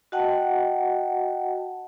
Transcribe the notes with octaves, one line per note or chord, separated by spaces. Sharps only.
F#4 D#5 F#5 G5 A5